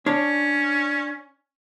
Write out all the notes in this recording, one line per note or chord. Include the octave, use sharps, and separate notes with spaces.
C#4 D4 C#5